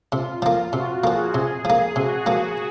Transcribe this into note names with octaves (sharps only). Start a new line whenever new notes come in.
C3 F4
F3 A#3
C3 F#4
F3 A#3 G#4
C3 G#4
F3 A#3
C3 F#4
F3 A#3